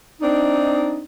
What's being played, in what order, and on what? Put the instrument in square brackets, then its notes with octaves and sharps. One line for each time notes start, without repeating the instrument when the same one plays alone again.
[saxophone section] C4 D4 D#4